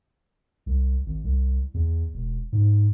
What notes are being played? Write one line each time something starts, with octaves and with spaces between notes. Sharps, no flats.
C2
G#1
C2
E2
E1
G#2